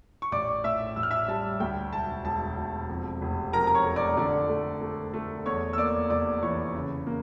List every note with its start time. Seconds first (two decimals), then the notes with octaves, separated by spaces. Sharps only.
0.22 C#6
0.32 A1 D5 D6
0.64 A2 E5 E6
0.96 A1 E6
1.03 F6
1.11 E5 E6
1.28 G3 A5
1.60 D2 G5
1.93 E1 A5
2.25 E1 A5
2.57 E1
2.89 F2
3.22 F1
3.53 F2 A#4 A#5
3.67 A#5
3.75 C#5 C#6
3.86 A3
3.96 D5 D6
4.17 D3 D5 D6
4.49 A3
4.81 A3
5.14 A3
5.46 E2 C#5 C#6
5.73 E6
5.78 A#3 D5 D6
6.10 F1 D5 D6
6.43 E3 C#5 C#6
6.74 C#3
7.07 A#3